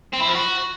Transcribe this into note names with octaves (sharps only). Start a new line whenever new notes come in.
C4
E4
F3
F#4